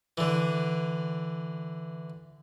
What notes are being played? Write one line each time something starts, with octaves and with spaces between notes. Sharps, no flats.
D3 E3